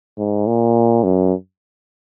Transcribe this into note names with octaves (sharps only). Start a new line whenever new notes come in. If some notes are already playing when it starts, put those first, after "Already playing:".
G#2
A#2
F#2